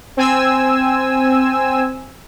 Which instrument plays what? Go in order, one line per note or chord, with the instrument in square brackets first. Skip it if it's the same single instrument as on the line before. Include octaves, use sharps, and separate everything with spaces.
[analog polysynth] C4 G#5 E6